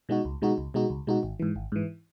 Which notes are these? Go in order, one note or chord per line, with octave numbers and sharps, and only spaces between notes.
B2 G#3 D#4 F#4
C#2
B2 G#3 D#4 F#4
C#2
B2 G#3 D#4 F#4
C#2
B2 G#3 D#4 F#4
G#1
G#2 E3
G#1
G#2 E3